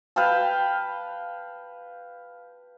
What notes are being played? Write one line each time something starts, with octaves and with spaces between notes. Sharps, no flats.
B4 F5 G5 A5